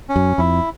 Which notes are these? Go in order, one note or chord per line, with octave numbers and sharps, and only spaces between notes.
C#4
F#2
F2 E4